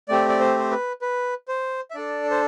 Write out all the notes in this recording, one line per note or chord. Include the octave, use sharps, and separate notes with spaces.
A3 C4 G4 D5
D5
C5
C5
B4
B4
C5
E5
D4 A4 D5
C5